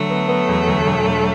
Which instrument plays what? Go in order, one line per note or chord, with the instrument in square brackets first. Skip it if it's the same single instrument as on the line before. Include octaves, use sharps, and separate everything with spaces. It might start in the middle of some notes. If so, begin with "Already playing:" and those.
Already playing: [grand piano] D3 [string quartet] F#3 A3
[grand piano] B3
B3
E2
D2
E1
E1